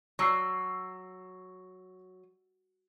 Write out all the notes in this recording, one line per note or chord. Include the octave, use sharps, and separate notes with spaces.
F#3 C#6 E6 C7